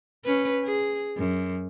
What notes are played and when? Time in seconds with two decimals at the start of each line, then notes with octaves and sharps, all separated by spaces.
0.25 C#4 B4
0.64 G#4
1.17 F#2